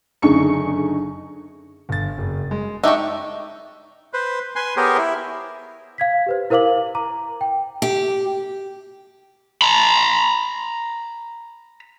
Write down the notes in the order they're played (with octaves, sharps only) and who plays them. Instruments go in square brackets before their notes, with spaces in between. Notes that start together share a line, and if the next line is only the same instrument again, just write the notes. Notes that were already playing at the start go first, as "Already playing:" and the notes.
[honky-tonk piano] F#1 D3 D#4 G#4 C#6 C#7
[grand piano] G1 A6
F#1
G#3
[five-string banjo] D4 D#4 G4 [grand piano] D#5 [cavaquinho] E5 C#6
[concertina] B4 C5
B4 G#5 C6
B3 G4 G#4 A#4 C5 C#5
E4
[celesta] F5 G#6 B6
G4 B4 C5
E4 A#4 C5 F5 D6 F#7
A#5 D6
G5
[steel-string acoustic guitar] G4
[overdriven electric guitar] A#5 B5